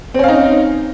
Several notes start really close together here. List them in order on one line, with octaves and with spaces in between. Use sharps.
C4 C#4 F5 D#4